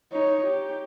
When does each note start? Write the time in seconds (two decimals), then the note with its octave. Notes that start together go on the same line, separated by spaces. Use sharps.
0.12 D#4 C#5
0.47 G4